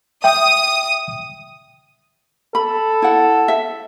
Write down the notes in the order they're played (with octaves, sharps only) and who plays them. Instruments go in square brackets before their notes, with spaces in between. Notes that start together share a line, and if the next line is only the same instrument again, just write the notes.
[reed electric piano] E5 G5 [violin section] D#6
[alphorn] A4 [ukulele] B5
[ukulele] E4 F#5
E5